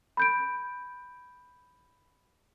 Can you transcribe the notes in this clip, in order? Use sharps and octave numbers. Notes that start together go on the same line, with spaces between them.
B5 G6 D7